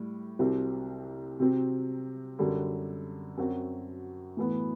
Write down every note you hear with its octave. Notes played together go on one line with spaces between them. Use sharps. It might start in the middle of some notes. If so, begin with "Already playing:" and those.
Already playing: A2 G3
C2 C3 F#3 C4 G4
C3 F#3 C4
F#2 D3 G3
F#2 F#3 C4 F#4
A2 E3 B3